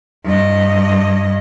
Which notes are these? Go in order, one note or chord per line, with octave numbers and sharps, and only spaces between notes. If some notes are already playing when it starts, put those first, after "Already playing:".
G2 D#5